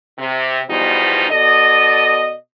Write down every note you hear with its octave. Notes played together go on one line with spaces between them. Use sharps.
C3
E2 G#2 B2 F3 G3 D#4
B2 A4 D5 D#5